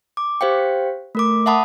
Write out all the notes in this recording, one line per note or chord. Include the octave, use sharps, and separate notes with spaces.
D6
G4 C5 F5 G5
A3 A#4 D6
E5 F#5 A5 B5 D#6